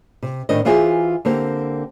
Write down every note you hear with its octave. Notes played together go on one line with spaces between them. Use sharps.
C3
A2 D#3 C4 D4 A#4 D#5
E3 F4 F#4 G#4 C5 E5
D3 A#3 C4 G4